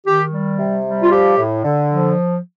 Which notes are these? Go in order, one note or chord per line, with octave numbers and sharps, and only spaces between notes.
D#3 G4
G3
C3
G3
F4
F3 G4
A2
D3
F3